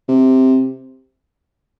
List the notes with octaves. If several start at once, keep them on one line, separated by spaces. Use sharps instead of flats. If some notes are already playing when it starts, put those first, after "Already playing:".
C3